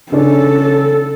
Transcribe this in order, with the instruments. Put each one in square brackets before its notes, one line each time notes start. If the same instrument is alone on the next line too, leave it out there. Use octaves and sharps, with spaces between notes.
[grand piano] C#3 C#4 D4 [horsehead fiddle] A4